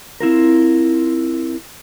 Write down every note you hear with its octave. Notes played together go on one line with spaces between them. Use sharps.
C4 E4 F4 A#4